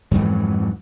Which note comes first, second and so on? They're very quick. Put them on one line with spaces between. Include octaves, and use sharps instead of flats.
F2 G#2 E3 F#3